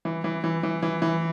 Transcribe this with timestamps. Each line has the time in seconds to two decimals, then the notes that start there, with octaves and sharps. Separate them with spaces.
0.05 E3
0.24 E3
0.44 E3
0.63 E3
0.82 E3
1.02 E3